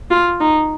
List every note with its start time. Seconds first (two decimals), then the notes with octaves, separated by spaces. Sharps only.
0.11 F4
0.40 D#4